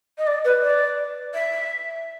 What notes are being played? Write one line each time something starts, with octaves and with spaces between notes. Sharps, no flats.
D#5
D5
B4
D5
E5